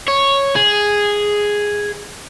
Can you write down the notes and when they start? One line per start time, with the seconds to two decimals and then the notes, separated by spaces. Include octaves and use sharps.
0.08 C#5
0.56 G#4